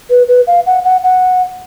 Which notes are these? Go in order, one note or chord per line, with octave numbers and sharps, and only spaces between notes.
B4
B4
F5
F#5
F#5
F#5